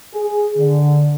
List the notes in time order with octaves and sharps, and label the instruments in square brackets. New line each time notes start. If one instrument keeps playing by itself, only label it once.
[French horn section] G#4
D3